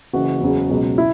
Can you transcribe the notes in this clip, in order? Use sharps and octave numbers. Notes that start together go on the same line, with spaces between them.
F#1 F#2 E3 F#4
F#1 E2 C#3 F#3
C#2 B2 F#3
E4